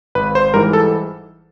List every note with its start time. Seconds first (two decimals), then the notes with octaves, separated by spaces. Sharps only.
0.15 G#1 B4
0.35 C5
0.54 G#2 E3 G3 A#4
0.73 A4